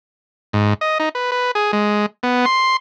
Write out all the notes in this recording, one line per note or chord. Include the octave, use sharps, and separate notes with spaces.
G#2
D#5
D#4
B4
B4
G#4
G#3
B3
C6